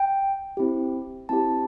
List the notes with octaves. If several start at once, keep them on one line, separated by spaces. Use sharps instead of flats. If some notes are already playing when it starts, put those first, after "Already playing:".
Already playing: G5
C4 E4 G4
C4 E4 G4 A5